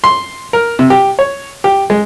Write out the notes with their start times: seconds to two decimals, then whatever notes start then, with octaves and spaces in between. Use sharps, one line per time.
0.04 C6
0.53 A#4
0.79 C3
0.90 G4
1.19 C#5
1.64 G4
1.90 G#3